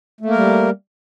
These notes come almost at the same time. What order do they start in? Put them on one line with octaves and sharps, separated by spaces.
A3 A#3 A#4 G3